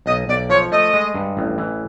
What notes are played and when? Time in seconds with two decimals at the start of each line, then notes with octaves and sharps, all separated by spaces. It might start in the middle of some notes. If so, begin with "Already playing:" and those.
0.06 B1 D#5
0.28 B1 D5
0.49 F3 C#5
0.72 A3 D#5
0.94 G#3
1.14 G2
1.37 A1
1.58 E3